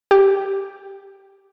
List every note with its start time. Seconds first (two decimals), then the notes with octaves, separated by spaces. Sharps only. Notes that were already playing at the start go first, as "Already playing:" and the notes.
0.11 G4